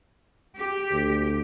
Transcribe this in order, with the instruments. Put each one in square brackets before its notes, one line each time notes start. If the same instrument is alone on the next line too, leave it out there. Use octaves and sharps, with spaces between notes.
[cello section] G4
[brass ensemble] D2